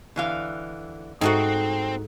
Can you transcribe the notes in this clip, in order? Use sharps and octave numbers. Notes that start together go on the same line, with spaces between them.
D3 E3 F5
G#2 A3 C4 D#4 F#4 F#5